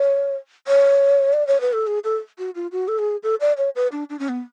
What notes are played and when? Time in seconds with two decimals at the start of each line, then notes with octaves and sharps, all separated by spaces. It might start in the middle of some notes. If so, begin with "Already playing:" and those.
Already playing: C#5
0.67 C#5
1.33 D5
1.47 C#5
1.61 B4
1.73 A4
1.87 G#4
2.04 A4
2.38 F#4
2.55 F4
2.72 F#4
2.88 A4
2.99 G#4
3.23 A4
3.41 D5
3.57 C#5
3.76 B4
3.92 D4
4.10 D4
4.19 C#4
4.29 B3